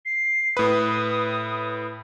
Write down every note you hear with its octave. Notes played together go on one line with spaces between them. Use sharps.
C7
A2 B4 D#6